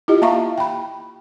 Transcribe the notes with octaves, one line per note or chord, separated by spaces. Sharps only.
E4 F4 G4 D#5
A#3 E5 F5 A#5 C#6
G5 B5